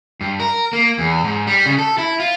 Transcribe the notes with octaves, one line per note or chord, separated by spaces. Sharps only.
G2
A#4
A#3
E2
G#2
G3
C#3
A4
E4
F4